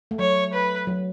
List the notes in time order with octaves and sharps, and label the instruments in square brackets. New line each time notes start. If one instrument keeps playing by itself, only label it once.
[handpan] A3
[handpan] F#3 [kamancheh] C#5
[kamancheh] B4
[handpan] F#3